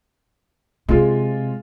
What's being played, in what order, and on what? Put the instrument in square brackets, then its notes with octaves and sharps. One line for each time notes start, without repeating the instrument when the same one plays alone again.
[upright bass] C3 [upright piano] G#3 F4